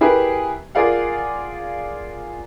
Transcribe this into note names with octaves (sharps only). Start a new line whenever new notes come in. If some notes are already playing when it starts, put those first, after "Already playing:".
E4 G4 G#4 A#4 B4
F4 G#4 A#4 D5 F5 F#5